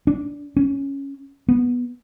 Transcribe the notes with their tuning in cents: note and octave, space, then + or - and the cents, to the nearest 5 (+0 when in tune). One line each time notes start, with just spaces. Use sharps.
D4 -20
C#4 +0
B3 -10